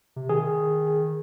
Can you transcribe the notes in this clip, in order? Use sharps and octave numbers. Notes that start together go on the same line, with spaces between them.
C3
D#3 G#4